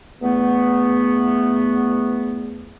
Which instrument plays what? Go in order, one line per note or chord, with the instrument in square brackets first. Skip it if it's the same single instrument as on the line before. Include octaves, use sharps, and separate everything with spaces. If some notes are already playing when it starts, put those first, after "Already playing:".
[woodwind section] E2 A3 B3